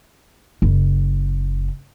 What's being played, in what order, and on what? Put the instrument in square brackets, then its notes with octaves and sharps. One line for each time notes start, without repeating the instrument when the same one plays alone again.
[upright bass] F#1